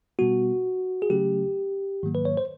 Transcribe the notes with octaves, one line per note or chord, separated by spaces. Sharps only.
B2 G3 B3 F#4
G#4
C#3 F#3 A3 C#4 G4
G#2 D#3 F#3 A#3
B4
C#5
C5